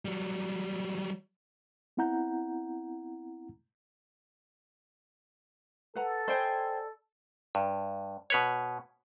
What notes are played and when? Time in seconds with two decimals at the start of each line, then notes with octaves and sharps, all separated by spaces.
0.05 F#3 G3
1.97 B3 C4 E4 F#5 A#5 G6
5.95 A4 B4 F#5 A#5
6.28 C5 D5 D#5 G5 G#5 B5
7.55 G2
8.30 B2 B4 C#5